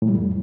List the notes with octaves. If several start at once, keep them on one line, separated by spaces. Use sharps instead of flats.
A2
G3
F2